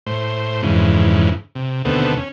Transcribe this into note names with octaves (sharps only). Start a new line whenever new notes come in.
A2 C5
F2 G#2 C#3 E3
C3
D#2 B2 D3 A3 B3 C4
C#4